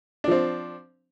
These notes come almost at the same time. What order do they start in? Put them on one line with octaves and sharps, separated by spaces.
D4 F3 C4